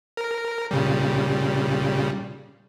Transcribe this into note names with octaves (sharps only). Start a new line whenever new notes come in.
A#4
A#2 C#3 G3